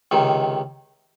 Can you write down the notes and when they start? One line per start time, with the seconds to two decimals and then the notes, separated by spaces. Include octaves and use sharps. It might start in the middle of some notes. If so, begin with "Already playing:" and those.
0.11 C#2 C3 D#3